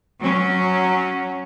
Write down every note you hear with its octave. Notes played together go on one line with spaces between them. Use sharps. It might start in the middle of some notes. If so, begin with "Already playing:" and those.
F#3 C#4